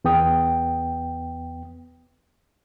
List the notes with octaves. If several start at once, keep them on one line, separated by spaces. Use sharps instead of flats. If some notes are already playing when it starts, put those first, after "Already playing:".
E2 B3 G5 D#6